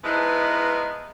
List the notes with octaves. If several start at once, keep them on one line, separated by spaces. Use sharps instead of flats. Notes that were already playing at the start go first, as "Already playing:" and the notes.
F3 G#3 B3 D#4 E4 B4